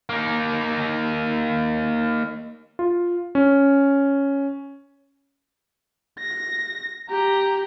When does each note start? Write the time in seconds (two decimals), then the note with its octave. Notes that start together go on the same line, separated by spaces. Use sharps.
0.09 A#3 D#4
2.79 F4
3.35 C#4
6.19 A#6
7.10 G4 A#5